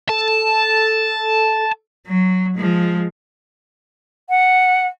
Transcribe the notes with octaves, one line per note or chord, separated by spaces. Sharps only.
A4 A5
F#3
F3 G#3
F#5